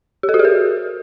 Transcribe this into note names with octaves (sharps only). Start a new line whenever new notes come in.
G4
A4
F#4
G#4
A#4